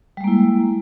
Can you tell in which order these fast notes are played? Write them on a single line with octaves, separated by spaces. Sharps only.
G3 G#3 A#3 E4